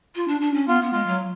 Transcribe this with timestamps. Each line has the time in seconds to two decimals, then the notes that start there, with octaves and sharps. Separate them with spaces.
0.15 F4
0.28 D4
0.41 D4
0.54 C#4
0.68 B3 F4
0.81 B3
0.92 G#3 F4
1.07 F#3